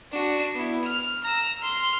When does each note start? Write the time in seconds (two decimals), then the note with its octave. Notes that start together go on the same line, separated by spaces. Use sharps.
0.12 D4 F#4
0.55 B3 E4
0.85 F6
1.23 A#5 E6
1.60 C6 F6